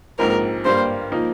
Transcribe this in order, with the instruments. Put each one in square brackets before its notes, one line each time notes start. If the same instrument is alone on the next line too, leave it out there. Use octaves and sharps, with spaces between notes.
[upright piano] A#1 G#2 F3 C4 [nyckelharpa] A#4
[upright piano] G2 G3 A#3 [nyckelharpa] C5
[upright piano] F3 A#3 D#4